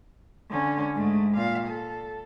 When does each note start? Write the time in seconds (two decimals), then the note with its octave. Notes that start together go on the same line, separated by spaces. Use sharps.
0.50 D3 C#4
0.94 G#2 A3
1.37 A#2 F5
1.67 A4